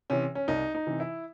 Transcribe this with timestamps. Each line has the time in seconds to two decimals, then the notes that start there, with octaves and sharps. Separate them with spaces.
0.10 C3 E3 C#4
0.35 C#4
0.48 C2 D#4
0.75 D#4
0.87 C3 E3
1.00 E4